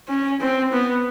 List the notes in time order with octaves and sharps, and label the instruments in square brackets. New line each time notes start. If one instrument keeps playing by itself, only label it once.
[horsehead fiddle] C#4
C4
B3